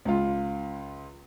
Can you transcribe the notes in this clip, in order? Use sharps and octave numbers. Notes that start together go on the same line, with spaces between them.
C#2 F4